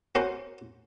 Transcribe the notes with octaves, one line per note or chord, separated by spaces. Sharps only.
C4 C#4 F#4 A#4 C5